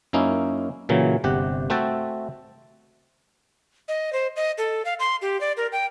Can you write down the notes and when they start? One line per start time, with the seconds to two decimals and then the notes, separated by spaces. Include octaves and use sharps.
0.13 F#2 A#3 C#4 D#4 E4
0.89 A#2 C#3 E3 F#3
1.24 G1 C3 G4 F#5
1.70 A3 C4 F#4 E5 G5 A5
3.88 D#5
4.13 C5
4.36 D#5
4.58 A4
4.85 F5
4.99 C6
5.22 G4
5.40 D5
5.57 A#4
5.72 G5